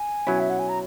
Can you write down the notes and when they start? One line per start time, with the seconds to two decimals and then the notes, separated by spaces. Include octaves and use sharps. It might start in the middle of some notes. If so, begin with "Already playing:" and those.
Already playing: G#5
0.27 B2 F#3 C#4 E4
0.40 E5
0.50 F#5
0.59 G#5
0.69 A#5